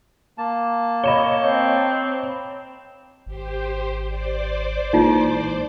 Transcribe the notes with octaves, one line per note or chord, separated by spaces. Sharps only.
A#3 A5
C#5 D#5 B5 E7 G7
C4
G#1 G4 C5
C5 D5 D6
B1 A#2 E3 G#3 D#4 F4